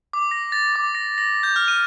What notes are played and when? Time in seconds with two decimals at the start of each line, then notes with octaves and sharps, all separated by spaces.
0.13 D6
0.31 A#6
0.52 A6
0.76 D6
0.95 A#6
1.18 A#6
1.43 G6
1.56 F6
1.68 D#7